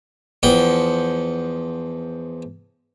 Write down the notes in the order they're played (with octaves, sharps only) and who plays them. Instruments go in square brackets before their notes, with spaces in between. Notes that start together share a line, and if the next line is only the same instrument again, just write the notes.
[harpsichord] E2 F3 F#5 G5